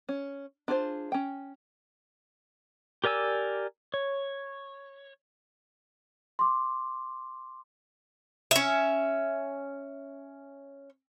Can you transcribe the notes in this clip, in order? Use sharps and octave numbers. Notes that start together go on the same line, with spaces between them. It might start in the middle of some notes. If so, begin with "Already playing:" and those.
C#4
D4 F4 G#4 B4 C5
C#4 G5
G4 A#4 D5 G#5 E6
C#5
C6 D6
C#4 E5